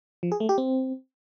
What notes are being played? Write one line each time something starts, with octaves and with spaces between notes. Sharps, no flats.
F3
G#4
A3
G4
C4